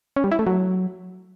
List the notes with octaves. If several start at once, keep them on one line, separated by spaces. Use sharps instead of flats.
C#4
G3
E4
A3
F#3